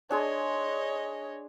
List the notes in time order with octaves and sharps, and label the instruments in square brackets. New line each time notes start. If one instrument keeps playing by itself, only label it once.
[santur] D4 G#4 C6 [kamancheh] C#5 D#5